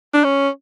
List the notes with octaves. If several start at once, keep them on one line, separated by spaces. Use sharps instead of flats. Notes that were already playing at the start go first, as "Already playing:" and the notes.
D4
C#4